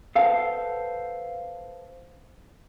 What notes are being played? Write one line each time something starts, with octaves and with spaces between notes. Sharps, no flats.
A4 B4 C5 F5 F#5 A5